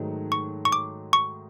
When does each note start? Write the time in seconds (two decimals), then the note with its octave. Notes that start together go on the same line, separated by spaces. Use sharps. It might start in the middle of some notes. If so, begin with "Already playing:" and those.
Already playing: G#2 D#3 F#3 A3
0.32 C#6
0.65 C#6
0.72 D6
1.13 C#6